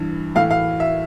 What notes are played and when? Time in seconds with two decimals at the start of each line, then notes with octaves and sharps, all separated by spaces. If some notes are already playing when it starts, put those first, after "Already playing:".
Already playing: G2 E3
0.35 A2 E3 F5
0.51 F5
0.80 E5